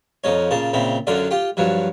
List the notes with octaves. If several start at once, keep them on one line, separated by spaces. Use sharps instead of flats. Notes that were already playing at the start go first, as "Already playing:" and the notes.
F2 F3 D#4 C#5
A#2 C#3 A5
A#2 C#3 C4 E4
F#2 D3 F#3 F4 D5
F4 G4
G2 F3 F#3